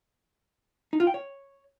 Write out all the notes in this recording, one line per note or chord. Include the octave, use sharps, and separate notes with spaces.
D#4
F4
G5
C#5